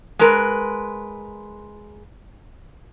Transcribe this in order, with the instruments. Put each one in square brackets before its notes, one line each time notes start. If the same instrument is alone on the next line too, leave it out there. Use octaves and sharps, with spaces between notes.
[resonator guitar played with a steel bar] G#3 A#4 B4